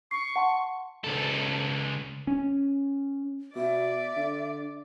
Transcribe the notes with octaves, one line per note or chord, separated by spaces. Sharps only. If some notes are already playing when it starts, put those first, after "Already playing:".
C#6 C7
F#5 A5 C6
C#2 A4
C#4
B2 D5 E5
D3